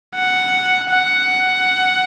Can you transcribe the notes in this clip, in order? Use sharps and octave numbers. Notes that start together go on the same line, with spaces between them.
F#5
F#5